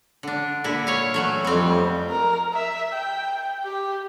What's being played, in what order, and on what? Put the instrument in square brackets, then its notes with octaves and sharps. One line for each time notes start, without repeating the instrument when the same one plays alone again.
[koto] D3 D4
A#2 D3 E4
C#5 F5
E3 F#3 A3
[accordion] F2 [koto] G3 C4
[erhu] A#4
E5
G5
G4